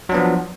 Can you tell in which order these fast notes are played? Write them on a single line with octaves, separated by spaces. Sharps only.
F#3 D4 B3 F3